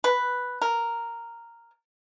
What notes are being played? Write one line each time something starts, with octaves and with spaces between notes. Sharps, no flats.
B4
A#4